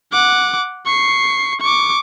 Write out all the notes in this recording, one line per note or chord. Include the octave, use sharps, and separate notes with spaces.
F#5 D6
C#6 C7
C#6 D6